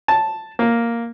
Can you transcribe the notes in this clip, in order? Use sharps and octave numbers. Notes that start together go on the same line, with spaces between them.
A5
A#3